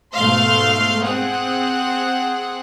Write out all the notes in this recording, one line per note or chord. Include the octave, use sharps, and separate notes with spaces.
G#2 B2 A3 F5 C6
C4 G#4 F#5